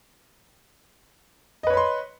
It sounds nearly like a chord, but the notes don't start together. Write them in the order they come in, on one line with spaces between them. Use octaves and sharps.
D#5 B4 C#5 B5 C6